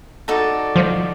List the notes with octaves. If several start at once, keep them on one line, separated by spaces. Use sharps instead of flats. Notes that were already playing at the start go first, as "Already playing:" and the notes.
D#4 F#4 A4 D5
F3